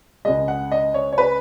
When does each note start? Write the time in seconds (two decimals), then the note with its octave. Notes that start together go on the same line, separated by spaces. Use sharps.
0.25 C#2 C#3 G#3 D#5
0.48 F#5
0.71 D#5
0.94 C#5
1.13 C#5
1.18 B4